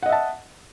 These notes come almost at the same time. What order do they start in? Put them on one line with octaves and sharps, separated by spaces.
F#5 D#5 E5 A5